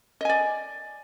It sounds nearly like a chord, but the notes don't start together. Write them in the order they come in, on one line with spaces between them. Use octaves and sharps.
D#5 G#5 D5